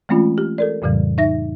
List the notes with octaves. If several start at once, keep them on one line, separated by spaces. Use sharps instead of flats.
E3 G#3 A3 C4 C#4 F4
G4
A4 A#4 D5
F2 A2 C#3 E3 G3
D#4 E5 A#6